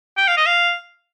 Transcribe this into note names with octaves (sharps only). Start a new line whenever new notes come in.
G5
F5
D#5
F5